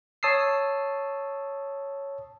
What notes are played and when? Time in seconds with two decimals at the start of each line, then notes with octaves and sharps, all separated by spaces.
0.23 C#5 A5 D#6 E6 C7